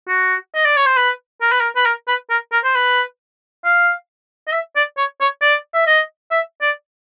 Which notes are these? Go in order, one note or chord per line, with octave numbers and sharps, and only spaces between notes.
F#4
D#5
D5
C#5
C5
B4
A#4
B4
A#4
B4
A#4
B4
A#4
A#4
C5
B4
F5
D#5
E5
D5
C#5
C#5
D5
E5
D#5
E5
D5